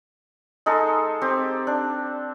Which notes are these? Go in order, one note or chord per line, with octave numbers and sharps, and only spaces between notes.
G#3 D#4 G#4 A4
C4 G4 C5
D4